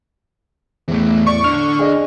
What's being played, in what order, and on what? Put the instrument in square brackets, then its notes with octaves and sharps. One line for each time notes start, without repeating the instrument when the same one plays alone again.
[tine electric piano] E2 A2 [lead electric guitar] E3 A3
[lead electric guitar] D5 [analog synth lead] C#6
[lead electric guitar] D3 D4 [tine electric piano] F6
[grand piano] G#4 D5 D#5